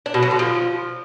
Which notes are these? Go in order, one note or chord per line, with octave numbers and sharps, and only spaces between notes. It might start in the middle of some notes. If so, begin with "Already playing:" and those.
D4
B2
F#3
D3
F3